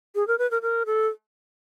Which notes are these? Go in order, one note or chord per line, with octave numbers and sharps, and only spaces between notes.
G#4
A#4
B4
A#4
A#4
A4